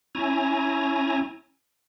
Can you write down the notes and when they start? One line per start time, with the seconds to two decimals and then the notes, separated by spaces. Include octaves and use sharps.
0.15 C#4 E4 G#5 A#5